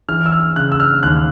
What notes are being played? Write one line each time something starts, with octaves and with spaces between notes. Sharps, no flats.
E3 F6
E6
F6
C#3 F#6
E6
F6
D#2 F#6